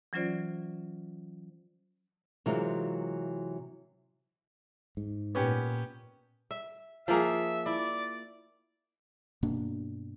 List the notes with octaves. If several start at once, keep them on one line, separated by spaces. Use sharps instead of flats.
E3 F#3 C#4 F4 C5 D5
C3 E3 F#3 G#3 F4 A#4
G#2
A#2 B3 C#4 G4
E5
F3 A#3 G#4 E5
E4 D5
G2 B2 A#3 D4